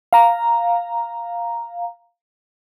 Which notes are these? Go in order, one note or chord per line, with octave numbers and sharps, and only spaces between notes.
F5 A#5